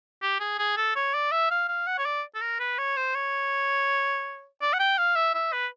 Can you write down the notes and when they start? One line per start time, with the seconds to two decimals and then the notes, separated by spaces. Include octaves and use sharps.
0.23 G4
0.40 G#4
0.59 G#4
0.77 A4
0.96 C#5
1.14 D5
1.32 E5
1.51 F5
1.69 F5
1.87 F#5
1.98 C#5
2.06 D5
2.35 A4
2.41 A#4
2.60 B4
2.78 C#5
2.97 C5
3.15 C#5
4.62 D5
4.73 F#5
4.80 G5
4.98 F5
5.16 E5
5.34 E5
5.53 B4